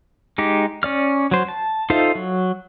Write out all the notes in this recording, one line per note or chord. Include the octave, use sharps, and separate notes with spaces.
G#3 D#4 G4
C#4 D5 F6
F#3 C5
A5
D#4 F4 A4 C5 E5
F#3